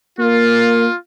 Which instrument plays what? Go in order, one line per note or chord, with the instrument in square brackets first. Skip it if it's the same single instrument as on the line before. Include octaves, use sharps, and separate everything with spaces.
[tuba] A#3 [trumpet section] F4